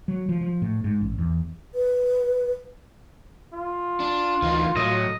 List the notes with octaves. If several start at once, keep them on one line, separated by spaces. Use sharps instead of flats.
F#3
F3
F3
A2
G#2
A1
E2
B4
F4
D4
D2 E3 D#4
A2 F#3 D#5